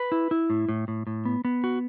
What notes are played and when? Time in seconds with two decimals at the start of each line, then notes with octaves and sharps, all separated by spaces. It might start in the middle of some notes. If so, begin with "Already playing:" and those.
Already playing: B4
0.12 E4
0.31 E4
0.50 A2
0.69 A2
0.88 A2
1.07 A2
1.25 B3
1.45 B3
1.64 F#4